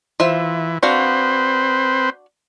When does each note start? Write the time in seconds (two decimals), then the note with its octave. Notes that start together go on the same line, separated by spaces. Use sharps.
0.20 E3 F4 C5 E5
0.83 C4 D4 F#4 B4 C5 F5